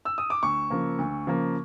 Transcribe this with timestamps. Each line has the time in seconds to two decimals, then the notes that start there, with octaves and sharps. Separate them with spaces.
0.05 E6
0.18 D#6
0.30 D6
0.43 D2 C#6
0.70 C#3 F3 A#3
0.98 D2
1.27 C#3 F3 A#3